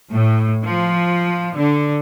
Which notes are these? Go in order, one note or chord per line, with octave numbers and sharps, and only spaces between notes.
A2
F3
D3